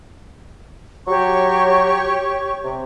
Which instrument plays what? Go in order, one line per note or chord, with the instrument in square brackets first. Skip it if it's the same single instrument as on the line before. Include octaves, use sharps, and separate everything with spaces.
[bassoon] F#3 [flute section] G4 C#5 C#6
[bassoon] C3